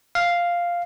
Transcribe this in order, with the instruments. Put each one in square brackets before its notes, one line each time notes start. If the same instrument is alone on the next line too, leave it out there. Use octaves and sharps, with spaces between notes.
[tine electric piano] F5